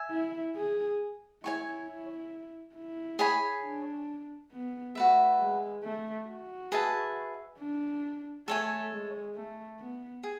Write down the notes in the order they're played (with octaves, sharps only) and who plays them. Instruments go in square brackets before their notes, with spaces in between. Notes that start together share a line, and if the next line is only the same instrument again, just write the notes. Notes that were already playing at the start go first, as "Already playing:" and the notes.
Already playing: [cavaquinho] E5 G#5
[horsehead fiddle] E4
G#4
[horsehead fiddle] E4 [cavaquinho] C#5 G#5 C#6
[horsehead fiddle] E4
E4
[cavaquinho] G#4 C#5 G#5 B5
[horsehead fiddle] D4
B3
[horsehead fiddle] A3 [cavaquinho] F#4 B4 E5
[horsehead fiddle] G#3
A3
F#4
[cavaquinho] G#4 B4 E5 A5
[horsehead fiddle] D4
[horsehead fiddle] A3 [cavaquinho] A4 C#5 G#5
[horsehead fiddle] G#3
A3
B3
[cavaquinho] G#4